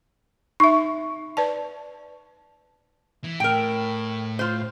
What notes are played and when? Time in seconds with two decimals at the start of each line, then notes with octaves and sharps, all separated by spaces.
0.60 D#4 E5 C#6
1.37 B4 D5 A5
3.24 E3
3.40 A2 A#4 G5
4.39 F4 C5